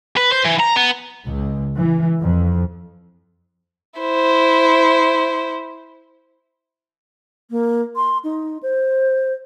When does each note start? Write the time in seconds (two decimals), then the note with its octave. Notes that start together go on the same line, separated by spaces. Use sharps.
0.17 B4
0.32 C5
0.46 E3
0.60 A#5
0.77 B3
1.24 C#2
1.78 E3
2.21 F2
3.99 E4 C5
7.50 A#3
7.96 C6
8.24 D#4
8.63 C5